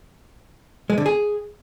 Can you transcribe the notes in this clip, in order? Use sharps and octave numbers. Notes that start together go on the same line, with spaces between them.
G#3
D3
G#4